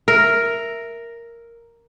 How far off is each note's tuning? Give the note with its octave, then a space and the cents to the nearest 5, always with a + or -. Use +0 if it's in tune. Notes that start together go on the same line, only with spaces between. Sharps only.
A#4 +0 E5 +5